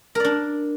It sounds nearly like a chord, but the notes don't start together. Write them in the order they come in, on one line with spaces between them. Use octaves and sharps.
A#4 D5 D4